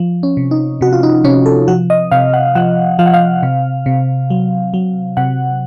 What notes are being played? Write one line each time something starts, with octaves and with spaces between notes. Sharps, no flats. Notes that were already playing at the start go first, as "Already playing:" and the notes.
Already playing: F3
C#4
C3
D#4
C3 F#4
F4
D#4
C3 C#4
A4
F3 F#4
D#5
C3 F5
F#5
F3 F#5
F3 F5
F#5
F5
C3
C3
F#3
F#3
C3 F#5